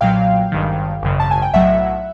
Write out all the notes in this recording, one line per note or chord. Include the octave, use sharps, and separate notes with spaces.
B1 A#2 F#3 F5 G5
G#1 G2 D#3
G#1 F#2 C#3
A5
G#5
G5
B1 A2 F#3 E5 F#5